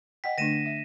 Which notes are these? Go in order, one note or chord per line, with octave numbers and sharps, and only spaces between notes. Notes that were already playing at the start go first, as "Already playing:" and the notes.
D#5 F#5 G5 B6
D3 A3 D4 A#6 D#7 E7
E5